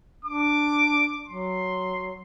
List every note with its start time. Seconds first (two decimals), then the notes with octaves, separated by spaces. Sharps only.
0.25 D4 D6
1.27 F#3 C6